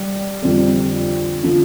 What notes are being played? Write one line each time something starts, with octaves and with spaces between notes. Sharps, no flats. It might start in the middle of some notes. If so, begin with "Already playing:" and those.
Already playing: G3
F2 D3 G3 C4
D3 F3